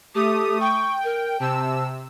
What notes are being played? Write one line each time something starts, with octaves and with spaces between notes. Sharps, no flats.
A3 G4 D#6
G5 C#6
A#4
C3 A5 E6